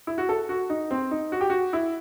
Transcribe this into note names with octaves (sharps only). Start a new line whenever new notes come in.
E4
F#4
A4
F#4
D#4
C4
D#4
F#4
G4
F#4
E4